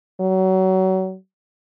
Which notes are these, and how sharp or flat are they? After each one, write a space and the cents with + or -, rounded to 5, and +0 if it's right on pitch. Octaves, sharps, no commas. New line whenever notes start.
F#3 +30